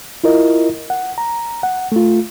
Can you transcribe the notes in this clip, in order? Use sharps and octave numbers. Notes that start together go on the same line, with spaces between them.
E4 F4 A#4 D#5
F#5
A#5
F#5
A3 F4